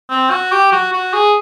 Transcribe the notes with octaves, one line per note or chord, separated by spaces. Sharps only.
C4
F#4
G4
F#4
F#4
G#4